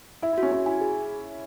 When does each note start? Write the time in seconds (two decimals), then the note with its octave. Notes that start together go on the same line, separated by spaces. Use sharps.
0.22 E4 E5
0.33 E4
0.38 C#4 F#4
0.52 C#4 F#4
0.66 E4 G#5
0.81 G#4